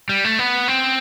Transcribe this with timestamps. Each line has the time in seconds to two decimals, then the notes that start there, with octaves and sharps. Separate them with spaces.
0.09 G3
0.24 A3
0.39 B3
0.68 C4